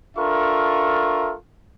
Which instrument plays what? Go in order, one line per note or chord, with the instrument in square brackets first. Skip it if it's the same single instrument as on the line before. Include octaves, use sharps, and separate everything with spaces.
[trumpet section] D4 F4 A4 A#4 E5 C#6